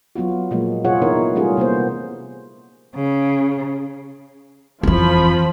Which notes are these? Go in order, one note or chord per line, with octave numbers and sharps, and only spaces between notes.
F#3 B3 F4 F#4
A#2 F3 F#3 G#3 A#3
C3 A#3 F4 G#4 C#5 F#5
E3 B3 D#4 E4 A#4 C#5
G3 A3 C#4 F4 G#4
C3 A#3 B3 C5
C#3
F2 E3 F3 B5